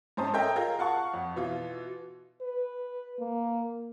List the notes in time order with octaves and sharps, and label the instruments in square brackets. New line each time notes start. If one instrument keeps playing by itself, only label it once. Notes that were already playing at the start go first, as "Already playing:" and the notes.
[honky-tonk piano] G#2 C#4 C5 A5 D#6
A4 A#4 C#5 D#5 E5 G5
F4 G#4 A#4
F5 F#5 A5 C#6
F2
B2 E3 F4
[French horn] B4
A#3